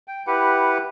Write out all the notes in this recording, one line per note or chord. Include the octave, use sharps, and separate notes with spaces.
G5
E4 G4 B4 F#5